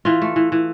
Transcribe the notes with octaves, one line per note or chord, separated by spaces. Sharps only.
E3 F4
A3
E3
E3